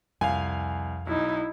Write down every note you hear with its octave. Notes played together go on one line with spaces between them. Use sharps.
C2 F2 F5 G#5
B1 D#4 E4